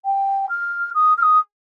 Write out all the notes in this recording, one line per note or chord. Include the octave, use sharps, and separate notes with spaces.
G5
F6
D#6
F6
D#6